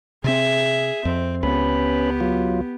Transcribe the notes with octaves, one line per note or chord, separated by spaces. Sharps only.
C3 C4 G#4 E5
F2 C4
C#2 B3 C#4 G4 B4 B5
F#3 F4